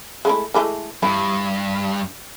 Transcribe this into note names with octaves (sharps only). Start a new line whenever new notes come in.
G#3 A3 E4
E3 G#3 A3
G2 E4